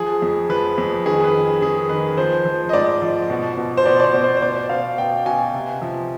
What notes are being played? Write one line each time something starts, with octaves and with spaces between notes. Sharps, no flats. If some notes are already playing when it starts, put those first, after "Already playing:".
Already playing: F3 G#4
F2
F3 B4
F2
D#3 G#4
B4
D#3
D#3 G#4
D#3 B4
F3 C5
F3
D#5
G#2 D5
F3
B2
B2
C5
B2 D5
D5
C5
B2
C5
C5
B2 D5
B2 F5
B2 G5
B2 G#5
C3
F3